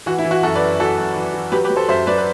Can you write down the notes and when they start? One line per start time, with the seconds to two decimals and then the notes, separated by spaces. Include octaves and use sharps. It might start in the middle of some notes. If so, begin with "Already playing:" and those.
0.06 E3 F#4
0.18 E4
0.24 E3
0.31 F#4
0.43 F#2 F#4 A4
0.55 B4 D5
0.62 F#2
0.79 E3 F#4 A4
0.98 F#2
1.16 E3
1.34 E3
1.52 F#3 G4 B4
1.64 G4 B4
1.70 F#3
1.76 A4 C5
1.88 F#2 C5 E5
2.07 F#3 B4 D5
2.18 B4